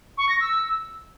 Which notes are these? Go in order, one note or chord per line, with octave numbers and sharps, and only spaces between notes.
C#6
A#6
E6